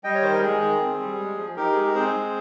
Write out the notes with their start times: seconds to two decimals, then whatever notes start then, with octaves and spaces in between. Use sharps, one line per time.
0.04 G3 D#5 G5
0.14 C#5
0.22 D#3 C5
0.32 A#4
0.42 G#3 G#4
0.61 D#3
0.81 C4
1.00 G3
1.19 G#3
1.37 F3
1.56 D#4 G4 A#4
1.72 G#3 G#4
1.84 A#4
1.95 C4 G#4 C5
2.14 G#3